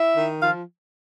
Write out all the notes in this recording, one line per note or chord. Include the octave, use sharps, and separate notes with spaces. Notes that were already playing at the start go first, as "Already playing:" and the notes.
Already playing: E4 E5
D#3
F3 F4 F5